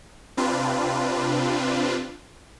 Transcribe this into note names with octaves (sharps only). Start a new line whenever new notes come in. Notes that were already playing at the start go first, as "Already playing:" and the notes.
C3 C4 D4 F4 B4